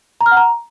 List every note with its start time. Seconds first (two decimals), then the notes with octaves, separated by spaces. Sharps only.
0.21 A#5
0.26 F6
0.31 F#5
0.37 A#5